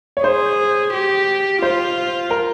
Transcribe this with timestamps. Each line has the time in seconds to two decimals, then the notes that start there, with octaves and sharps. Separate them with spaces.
0.17 C#5
0.24 G#4 C5
0.94 G4
1.62 F4 C5
2.31 A#4